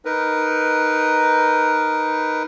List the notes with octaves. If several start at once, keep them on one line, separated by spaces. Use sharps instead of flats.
D#4 A#4 B4